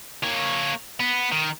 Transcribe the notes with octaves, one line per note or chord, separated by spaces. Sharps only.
A#3 C#5
B3
D#3